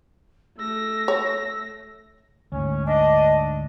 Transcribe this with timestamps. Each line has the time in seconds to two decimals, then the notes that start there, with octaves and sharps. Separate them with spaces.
0.58 A3 E6 A#6
1.08 C#5
2.52 D2 G#2 C#4
2.87 D4 D#5